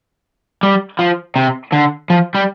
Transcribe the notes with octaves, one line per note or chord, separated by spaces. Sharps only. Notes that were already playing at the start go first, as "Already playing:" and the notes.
G3
F3
C3
D3
F3
G3